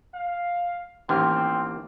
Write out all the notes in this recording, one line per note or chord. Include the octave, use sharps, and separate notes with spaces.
F5
A1 D#2 C4 C6 D6 F6